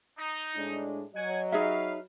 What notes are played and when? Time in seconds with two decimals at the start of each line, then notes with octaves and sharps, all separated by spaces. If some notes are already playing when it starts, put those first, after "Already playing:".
0.18 D#4
0.55 A2 G#3 D4
1.15 F#3 D#5 F#5 G#5
1.52 D#4 G#4 B4 E5 F5